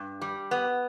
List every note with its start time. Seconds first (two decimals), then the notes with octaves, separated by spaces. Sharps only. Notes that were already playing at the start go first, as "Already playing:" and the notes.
Already playing: G2
0.21 G3
0.51 B3